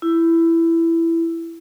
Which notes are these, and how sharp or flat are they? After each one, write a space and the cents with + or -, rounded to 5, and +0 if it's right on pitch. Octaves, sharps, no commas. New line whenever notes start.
E4 +10